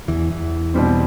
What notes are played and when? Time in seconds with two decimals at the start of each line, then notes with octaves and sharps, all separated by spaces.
0.08 E2 E3
0.30 E2 E3
0.74 B2 G3 C4